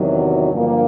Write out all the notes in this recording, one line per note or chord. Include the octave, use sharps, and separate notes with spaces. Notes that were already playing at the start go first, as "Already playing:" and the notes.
Already playing: E2 C3 D#3 F#3
G2 D3 F3 A#3